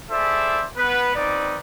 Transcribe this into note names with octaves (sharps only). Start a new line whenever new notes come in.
E4 G#4 A4 C5 D5 E5
B3 B4
C4 D#4 B4 D5